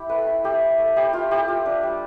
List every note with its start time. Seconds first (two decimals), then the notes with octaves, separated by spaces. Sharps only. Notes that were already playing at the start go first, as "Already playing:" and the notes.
Already playing: E4 G4
0.09 A3 B4
0.18 A4
0.27 E4
0.44 A3 G4
0.62 E4
0.79 A3
0.96 E4 G4
1.13 A3 F4
1.31 E4 G4
1.48 F4
1.66 D4
1.83 G3